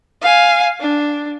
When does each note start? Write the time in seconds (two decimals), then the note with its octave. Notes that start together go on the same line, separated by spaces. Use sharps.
0.21 F5 G#5
0.80 D4